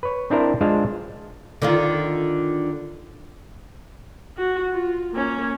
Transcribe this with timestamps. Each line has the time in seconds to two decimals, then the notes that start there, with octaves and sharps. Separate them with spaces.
0.03 B4 C#5
0.30 C4 D4 E4 A#4 C5 D5
0.61 G#3 D4 F4 C5 F5
1.62 D3 D#3 F4
4.37 F#4
4.72 F4
5.13 A#3 C#4